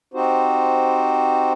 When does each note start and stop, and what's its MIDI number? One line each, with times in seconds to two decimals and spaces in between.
0.14 1.53 60
0.14 1.53 63
0.14 1.53 66
0.14 1.53 67
0.14 1.53 72